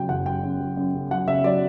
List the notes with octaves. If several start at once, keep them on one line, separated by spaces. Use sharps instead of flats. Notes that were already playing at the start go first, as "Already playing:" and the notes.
Already playing: C#3 F#3 G5
F#1 F#5
F#2 G5
F#2
F#3
F#2
C#3
F#3 F#5
C#3 E5
F#3 D5